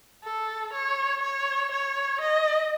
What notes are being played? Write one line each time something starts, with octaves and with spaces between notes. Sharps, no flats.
A4
C#5
C#5
C#5
D#5